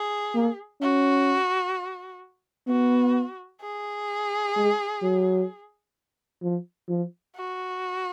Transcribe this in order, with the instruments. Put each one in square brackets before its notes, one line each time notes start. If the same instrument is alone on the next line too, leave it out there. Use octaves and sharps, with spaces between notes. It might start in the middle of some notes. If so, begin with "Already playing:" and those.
Already playing: [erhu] G#4
[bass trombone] A#3
[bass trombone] C#4 [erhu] F#4
[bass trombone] B3 [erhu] F#4
[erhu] G#4
[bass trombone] G#3
F#3
F3
F3
[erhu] F#4